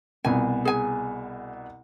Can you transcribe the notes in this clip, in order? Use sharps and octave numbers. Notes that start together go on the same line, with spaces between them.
C2 B2 B3 G#5
G#4 G#5